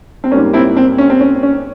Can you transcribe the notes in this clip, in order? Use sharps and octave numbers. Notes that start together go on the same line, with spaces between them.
C4
G#2 G3 A#3 C#4
C4 E4
C4
C#4
C4
C#4
C#4